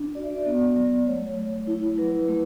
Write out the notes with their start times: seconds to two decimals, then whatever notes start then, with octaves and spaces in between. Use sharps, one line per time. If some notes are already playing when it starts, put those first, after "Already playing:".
Already playing: D4
0.15 F#4 D5
0.23 E5
0.30 D5
0.46 B3
0.76 F#3
1.07 A3 C#5
1.37 F#3
1.67 E4
1.98 F#3 B4
2.28 A3